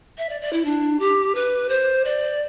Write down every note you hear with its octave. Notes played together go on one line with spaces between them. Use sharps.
E5
D5
D5
E4
D4
G4
B4
C5
D5